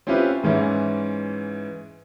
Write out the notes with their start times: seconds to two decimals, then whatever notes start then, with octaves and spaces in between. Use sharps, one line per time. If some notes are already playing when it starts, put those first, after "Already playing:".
0.07 C4 C#4 E4 F4 G4 B4
0.44 G#2 E3 C#4 E4